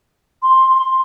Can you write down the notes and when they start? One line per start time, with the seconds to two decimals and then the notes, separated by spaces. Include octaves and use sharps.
0.42 C6
0.75 C6